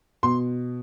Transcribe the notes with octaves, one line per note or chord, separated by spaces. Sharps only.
B2 C6